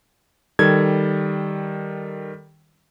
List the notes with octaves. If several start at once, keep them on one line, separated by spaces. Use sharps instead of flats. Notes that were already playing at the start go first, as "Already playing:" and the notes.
D#3 G3 A4 G#6